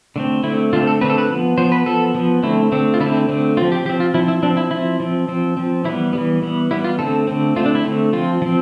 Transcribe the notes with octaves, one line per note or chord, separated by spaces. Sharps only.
D3 A3 C4
D3 A3 C4 E4
D3 A3 C4 F4
A4
D3 A3 C4 B4
A4
B4
F3 B3
F3 B3 C5
B4
F3 B3 A4
F3 B3
D3 A3 C4 E4
D3 A3 C4
F4
D3 A3 C4 E4
D3 A3 C4
F3 C4 F4
G4
F3 C4 G4
F4
F3 C4 E4
E4
F3 C4 D4
E4
F3 C4 E4
F3 C4
F3 C4
F3 C4
E3 G3 B3 E4
E3 G3 B3
E3 G3 B3
E3 G3 B3 E4
F4
D3 A3 C4 A4
D3 A3 C4
D3 A3 C4 F4
D4
E4
D3 A3 C4
F3 C4 F4
F3 C4